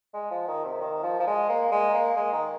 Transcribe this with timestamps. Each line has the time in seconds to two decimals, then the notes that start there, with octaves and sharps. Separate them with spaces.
0.13 G#3
0.31 F3
0.48 D#3
0.65 C3
0.81 D#3
1.03 F3
1.20 F3
1.27 G#3
1.49 A#3
1.72 G#3
1.94 A#3
2.16 G#3
2.32 D#3